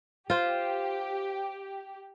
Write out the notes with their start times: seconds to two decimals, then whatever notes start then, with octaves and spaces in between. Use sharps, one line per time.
0.30 F4 G4 C5